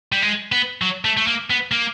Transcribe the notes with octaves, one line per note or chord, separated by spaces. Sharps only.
G3
G#3
B3
F#3
A3
A3
A#3
B3
A#3